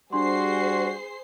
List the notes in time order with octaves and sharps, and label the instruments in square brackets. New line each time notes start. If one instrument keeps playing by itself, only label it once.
[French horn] G3 [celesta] D4 C6 [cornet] F#4 [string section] G#4 C5 C7